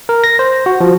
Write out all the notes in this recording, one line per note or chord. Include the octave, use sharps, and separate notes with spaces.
A#4
A#6
C5
F#4
F3